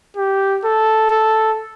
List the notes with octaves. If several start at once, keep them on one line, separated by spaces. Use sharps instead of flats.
G4
A4
A4